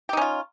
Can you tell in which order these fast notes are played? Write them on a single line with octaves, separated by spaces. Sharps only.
G4 D#4 C#4 F4